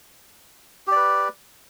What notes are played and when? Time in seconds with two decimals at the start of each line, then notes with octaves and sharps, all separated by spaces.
0.87 G4
0.92 D5
0.96 B4